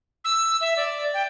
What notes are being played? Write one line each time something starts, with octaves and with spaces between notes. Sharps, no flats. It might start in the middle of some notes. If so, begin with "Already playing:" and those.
E6
E5
D5
G5